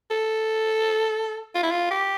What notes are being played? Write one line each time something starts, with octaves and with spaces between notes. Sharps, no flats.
A4
F4
E4
F4
G4